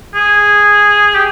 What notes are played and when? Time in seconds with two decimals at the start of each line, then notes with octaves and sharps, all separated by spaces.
0.15 G#4
1.14 G4